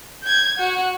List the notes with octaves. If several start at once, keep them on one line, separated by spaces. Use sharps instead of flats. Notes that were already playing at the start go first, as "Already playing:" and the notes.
G6 G#6
F#4